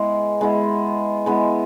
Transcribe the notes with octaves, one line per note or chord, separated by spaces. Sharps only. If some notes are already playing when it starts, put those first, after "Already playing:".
Already playing: G#3 B3 E4
G#3 B3 E4
G#3 B3 E4